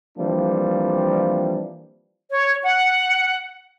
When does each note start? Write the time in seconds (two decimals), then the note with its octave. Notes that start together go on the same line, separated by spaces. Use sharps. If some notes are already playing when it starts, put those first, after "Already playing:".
0.18 E3 F3 G3 A#3 C4 D4
2.31 C#5
2.64 F#5